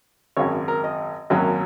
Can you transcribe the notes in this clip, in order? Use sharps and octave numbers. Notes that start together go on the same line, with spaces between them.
G#1 F#2 C#3 C#5
A#4
D#5
G#1 F#2 F#3 A#3 C#4